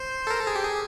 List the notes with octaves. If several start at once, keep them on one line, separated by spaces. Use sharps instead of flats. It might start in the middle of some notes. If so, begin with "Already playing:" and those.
Already playing: C5
A4
A#4
A4
G#4
G4
G#4